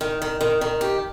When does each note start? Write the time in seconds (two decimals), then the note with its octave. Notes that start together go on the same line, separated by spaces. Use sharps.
0.01 D#3
0.22 D#3
0.41 D#3
0.61 D#3
0.81 G4